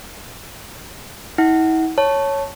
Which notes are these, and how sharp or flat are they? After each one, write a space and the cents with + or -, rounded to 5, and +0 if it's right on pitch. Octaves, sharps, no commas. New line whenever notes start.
E4 -45 F#5 +15
C#5 +0 A5 +0